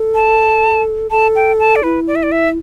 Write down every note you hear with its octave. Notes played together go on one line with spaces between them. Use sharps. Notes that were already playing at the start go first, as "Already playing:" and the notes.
Already playing: A4
A5
A4 A5
G5
A5
D5
E4 B4
D5
E5
D5
E5